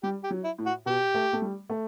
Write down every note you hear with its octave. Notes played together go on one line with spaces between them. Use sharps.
G3 G4
G4
F#3
E4
A2
F#4
B2 G4
A3
A3
G3
A3